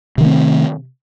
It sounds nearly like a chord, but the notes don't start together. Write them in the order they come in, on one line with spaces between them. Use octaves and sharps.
C3 D#3 A3 C4